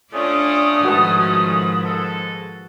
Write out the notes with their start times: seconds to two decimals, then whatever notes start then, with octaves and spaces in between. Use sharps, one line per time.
0.13 A3 C#4 D4 F4 D5 D#6
0.84 G#2 D#3 F3 F#4 B4 A5
1.85 G#3 G#4 A4